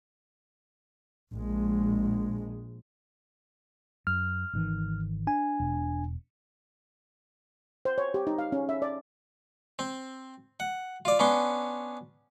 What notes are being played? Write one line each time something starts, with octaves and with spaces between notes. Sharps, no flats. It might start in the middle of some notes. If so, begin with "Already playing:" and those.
A#1 G#3
F#2 F6
G#1 D#3 E3
D4 G#5
E1
C5
C#5
G4
D#4
F5
C#4
E5
D5
C4
F#5
F4 D5
B3 C#4 D4 C6